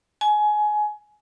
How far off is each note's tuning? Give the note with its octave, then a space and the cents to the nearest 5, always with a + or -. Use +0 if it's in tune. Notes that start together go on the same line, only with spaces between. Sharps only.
G#5 +20